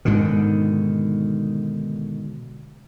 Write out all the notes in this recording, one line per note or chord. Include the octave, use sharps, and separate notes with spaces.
G#2 B2 D3 D#3